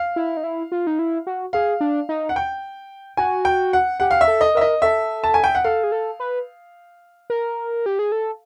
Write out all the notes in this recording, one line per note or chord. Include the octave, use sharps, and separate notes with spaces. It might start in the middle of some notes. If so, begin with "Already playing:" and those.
Already playing: F5
E4
D#4
E4
F4
D#4
E4
F#4
G#4 F5
D4
D#4
F#5
G5
F#4 G#5
G5
F#5
G4 F#5
F5
E5
A4
D#5
A#4 E5
D#5
A4 E5
A5
G#5
G5
F#5
A4 F5
G#4
A4
B4
A#4
G4
G#4
A4